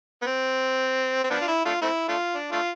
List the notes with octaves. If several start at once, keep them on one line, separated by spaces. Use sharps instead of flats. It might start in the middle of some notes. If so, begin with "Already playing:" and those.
B3
C4
C4
F3 B3 D4
F4
E4
A3 D4 F4
A3 C4 E4
A3 D4 F4
D4
A3 D4 F4